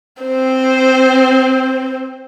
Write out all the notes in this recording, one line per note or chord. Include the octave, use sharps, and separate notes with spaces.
C4 C5